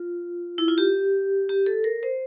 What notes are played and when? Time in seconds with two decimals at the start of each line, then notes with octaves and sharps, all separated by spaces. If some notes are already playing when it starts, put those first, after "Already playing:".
Already playing: F4
0.58 E4
0.68 F4
0.78 G4
1.49 G4
1.66 A4
1.84 A#4
2.03 C5